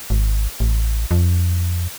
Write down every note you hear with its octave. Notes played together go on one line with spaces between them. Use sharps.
G#1
A1
F2